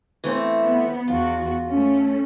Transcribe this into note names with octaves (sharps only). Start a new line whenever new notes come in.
E3 A3 C4
B3
E2 F4 F#4
A3 C#4